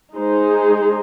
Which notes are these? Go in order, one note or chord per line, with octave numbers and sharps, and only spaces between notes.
G#3 D#4 G#4 C5